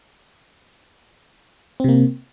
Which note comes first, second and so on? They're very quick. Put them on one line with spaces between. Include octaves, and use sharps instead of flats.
C4 C3 A#3